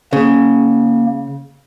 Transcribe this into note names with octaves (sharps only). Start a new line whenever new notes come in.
C#3 A#3